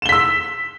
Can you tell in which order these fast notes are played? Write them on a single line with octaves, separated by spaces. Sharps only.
E7 G7 B6 E6